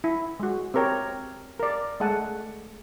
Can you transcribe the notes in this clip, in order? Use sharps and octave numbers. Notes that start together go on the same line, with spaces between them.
E4
G#3 F#4
C4 G4 A#4 C#5 G5
A#4 D5
G#3 A3 G#4 F#5 A5